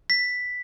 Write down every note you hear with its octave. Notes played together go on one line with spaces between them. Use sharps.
B6